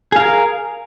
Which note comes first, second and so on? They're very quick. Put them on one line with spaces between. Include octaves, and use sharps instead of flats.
G#4 F5 A#4